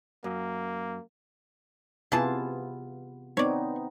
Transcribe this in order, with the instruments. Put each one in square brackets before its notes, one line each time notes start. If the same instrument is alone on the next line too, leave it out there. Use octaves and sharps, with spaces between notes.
[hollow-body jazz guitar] F#2 [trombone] A#3
[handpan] C3 B3 F4 [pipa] E3 G#4 A5
[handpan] B3 C4 D#4 [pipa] C#5 D5